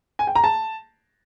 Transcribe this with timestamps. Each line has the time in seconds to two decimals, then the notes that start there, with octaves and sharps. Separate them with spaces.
0.19 G#5
0.27 G5
0.35 A#5
0.44 A5